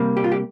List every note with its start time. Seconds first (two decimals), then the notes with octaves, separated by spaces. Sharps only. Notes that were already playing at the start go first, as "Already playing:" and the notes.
Already playing: C3 G3 A#3
0.17 G4
0.24 F4
0.32 G4